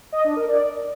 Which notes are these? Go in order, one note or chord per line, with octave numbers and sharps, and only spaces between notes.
D#5
D4
A#4
D5